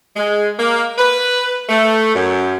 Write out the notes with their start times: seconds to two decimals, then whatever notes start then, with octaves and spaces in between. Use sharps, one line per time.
0.16 G#3
0.59 A#3
0.98 B4
1.69 A3
2.15 F#2